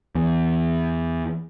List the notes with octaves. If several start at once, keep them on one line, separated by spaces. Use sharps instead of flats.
E2